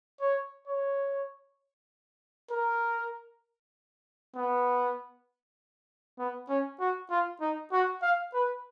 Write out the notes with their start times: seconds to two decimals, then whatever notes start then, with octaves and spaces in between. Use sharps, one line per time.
0.21 C#5
0.67 C#5
2.51 A#4
4.35 B3
6.19 B3
6.49 C#4
6.80 F#4
7.10 F4
7.41 D#4
7.72 F#4
8.02 F5
8.34 B4